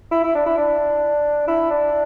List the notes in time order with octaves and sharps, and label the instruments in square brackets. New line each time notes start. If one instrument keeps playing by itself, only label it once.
[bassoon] E4
E4
D4
E4
D4
E4
D4